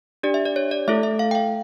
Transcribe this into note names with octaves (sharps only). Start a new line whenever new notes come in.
D4 G4 D5
E5
D5
C#5
D5
A3 E4 A4 E5
E5
F5
G5
F5